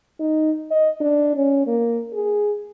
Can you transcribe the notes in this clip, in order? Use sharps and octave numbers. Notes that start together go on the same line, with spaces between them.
D#4
D#5
D4
C#4
A#3
G#4